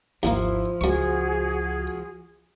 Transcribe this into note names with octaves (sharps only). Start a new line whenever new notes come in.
G#1 D#2 D#3 F3 A#3 E4 F4
C#2 F#2 F#4 G#4 C#6